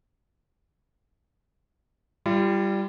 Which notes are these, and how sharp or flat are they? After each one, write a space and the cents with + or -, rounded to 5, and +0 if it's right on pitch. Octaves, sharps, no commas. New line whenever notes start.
G3 +0 F4 -40